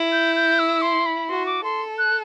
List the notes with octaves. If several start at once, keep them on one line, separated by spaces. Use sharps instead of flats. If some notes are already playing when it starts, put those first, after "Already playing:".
Already playing: E4
G6
G6
E6
C6
B5
F#4 C6
D6
A4 C6
F#6